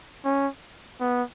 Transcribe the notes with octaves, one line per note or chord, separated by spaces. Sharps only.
C#4
B3